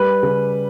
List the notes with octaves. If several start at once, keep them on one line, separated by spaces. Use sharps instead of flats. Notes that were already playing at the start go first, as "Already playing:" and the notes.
Already playing: G3 B4
C#3